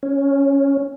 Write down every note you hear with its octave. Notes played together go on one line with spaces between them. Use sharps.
C#4